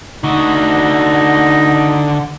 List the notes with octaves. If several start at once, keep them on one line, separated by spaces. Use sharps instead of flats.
D3 D#4 F#4